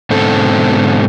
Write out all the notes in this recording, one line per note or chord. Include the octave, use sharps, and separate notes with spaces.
G#2 B2 D3 C4 A4